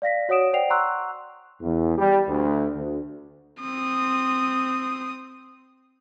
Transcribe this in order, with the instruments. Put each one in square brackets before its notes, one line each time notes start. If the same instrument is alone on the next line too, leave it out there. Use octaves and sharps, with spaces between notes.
[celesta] D5 F5 A#6 B6
F#4 C#5 F#5 D#6 D7 E7
C5 D5 F#5 G5 C7 F7
F#5 A#5 C6 C#6 E6 F#6
[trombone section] E2
G3
D2
D2
[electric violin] C4 D#6